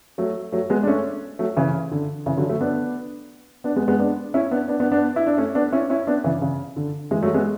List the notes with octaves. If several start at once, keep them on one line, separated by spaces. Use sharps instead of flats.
F#3 A3
F#3 A3
G#3 B3
D4
A3 C#4
F#3 A3
C#3 E3
D3
C#3 E3
D3 F#3
F#3 A3
B3 D4
B3 D4
G#3 B3
G#3 B3
B3 D4
C#4 E4
B3 D4
B3 D4
B3 D4
B3 D4
E4
D4
A3 C#4
B3 D4
C#4 E4
C#4 E4
B3 D4
C#3 E3
C#3
D3
E3 G#3
F#3 A3
G#3 B3